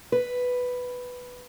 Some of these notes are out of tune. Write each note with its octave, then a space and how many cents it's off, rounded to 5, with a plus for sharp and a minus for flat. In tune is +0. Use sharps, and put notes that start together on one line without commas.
B4 +5